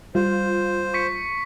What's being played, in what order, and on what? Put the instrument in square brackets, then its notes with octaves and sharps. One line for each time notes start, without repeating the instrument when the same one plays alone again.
[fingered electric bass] G3 [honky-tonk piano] F4 [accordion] C5
[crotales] C#6 B6 C#7